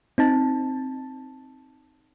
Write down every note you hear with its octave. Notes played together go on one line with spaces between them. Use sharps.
C4 D#4 A5